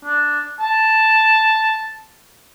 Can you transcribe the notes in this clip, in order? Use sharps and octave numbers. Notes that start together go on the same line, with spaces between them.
D4
A5